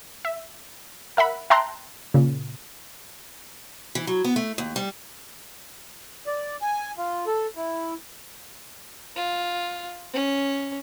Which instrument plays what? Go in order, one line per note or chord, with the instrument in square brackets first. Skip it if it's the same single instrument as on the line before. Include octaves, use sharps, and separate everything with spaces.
[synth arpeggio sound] E5
A#4 E5 F#5 B5
E5 G5 A5 A#5 C6 F#6
A#2 C#3
[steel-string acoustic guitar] E3
F#3
B3
A3
D#2
G3
[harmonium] D5
G#5
F4
A4
E4
[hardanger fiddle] F4
C#4